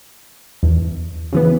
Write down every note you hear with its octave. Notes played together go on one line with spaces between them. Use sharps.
E2
C#3 E3 B3